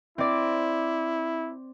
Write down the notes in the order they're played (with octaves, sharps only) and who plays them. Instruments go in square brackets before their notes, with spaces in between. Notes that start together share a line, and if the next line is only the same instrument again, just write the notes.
[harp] C4 D5 [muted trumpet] E4